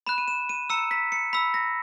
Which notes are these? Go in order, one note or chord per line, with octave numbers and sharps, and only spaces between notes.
B5 F#6 E7
D#7
E7
D#7
A#5 E6 C#7
B6
C#7
B5 E6 B6
A#6